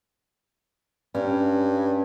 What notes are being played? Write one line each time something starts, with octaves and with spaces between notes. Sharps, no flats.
G2 C#4